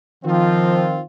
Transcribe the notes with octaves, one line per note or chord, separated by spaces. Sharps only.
D#3 F3 C4 F4